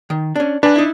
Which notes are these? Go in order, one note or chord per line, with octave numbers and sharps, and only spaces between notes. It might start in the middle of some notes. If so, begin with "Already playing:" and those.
D#3
C#4 D4
D4 B4 G#5
D#4 E4